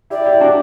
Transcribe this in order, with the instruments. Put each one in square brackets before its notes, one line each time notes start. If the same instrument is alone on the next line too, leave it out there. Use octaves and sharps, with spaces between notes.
[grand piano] E4 G4 [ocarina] D5
[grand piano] E4 G4
D4 F#4